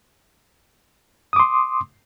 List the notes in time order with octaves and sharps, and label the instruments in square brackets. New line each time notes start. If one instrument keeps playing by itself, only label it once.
[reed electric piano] D#6
D6
C6